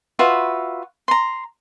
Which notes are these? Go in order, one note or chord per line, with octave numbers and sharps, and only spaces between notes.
F4 F#4 B4 E5
A#5 C6